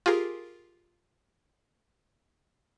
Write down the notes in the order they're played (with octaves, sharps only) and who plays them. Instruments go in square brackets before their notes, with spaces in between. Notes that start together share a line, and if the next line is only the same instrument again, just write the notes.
[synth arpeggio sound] F4 G4 G#4 A#4